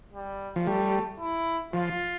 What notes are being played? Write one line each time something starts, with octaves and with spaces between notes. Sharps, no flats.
G3
F3
G3 A3
E4
F3 F4